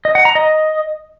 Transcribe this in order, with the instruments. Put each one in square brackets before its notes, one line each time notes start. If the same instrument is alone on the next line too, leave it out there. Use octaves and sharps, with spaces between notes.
[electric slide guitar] D#5
F#5
A#5
D#5